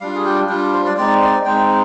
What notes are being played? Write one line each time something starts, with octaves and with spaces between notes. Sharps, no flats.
G3 D4 F4 F5
G#4
G4
G3 D4 F4
C5
D5
G#3 C4 D#4 D5
D5
G#3 C4 D#4 G5